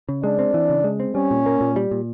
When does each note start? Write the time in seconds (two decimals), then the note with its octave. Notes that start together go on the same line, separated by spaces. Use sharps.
0.09 C#3
0.23 G#3 D4
0.39 C4
0.54 E3
0.70 C#3
0.84 G#3
1.00 C4
1.15 G3 C#4
1.31 A#2
1.46 A#3
1.61 A#2
1.76 G3
1.91 A#2